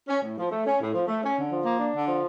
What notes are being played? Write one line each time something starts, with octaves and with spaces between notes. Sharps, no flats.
C#4
A2
F3
A3
C#4
A2
F3
A3
C#4
D3
F3
A#3
D4
D3
F3